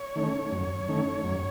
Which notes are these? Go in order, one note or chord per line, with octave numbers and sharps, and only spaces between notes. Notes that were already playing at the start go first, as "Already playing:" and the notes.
Already playing: C#5
D#3 A3 C#4
F#2
D#3 A3 C#4
F#2